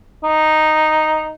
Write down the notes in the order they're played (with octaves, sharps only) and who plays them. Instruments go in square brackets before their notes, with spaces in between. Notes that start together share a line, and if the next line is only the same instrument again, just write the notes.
[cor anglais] D#4